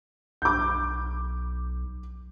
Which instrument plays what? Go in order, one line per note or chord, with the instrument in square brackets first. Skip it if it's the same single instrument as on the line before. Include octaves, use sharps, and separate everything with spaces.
[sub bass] B1 [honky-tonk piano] D6 G6